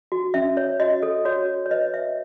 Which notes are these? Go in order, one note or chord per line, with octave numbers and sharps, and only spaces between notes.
F#4
C#4 E5
C#5
F#4 D#5
A4
F#4 C#5
C#5
C#5
B4 D#5
B4 E5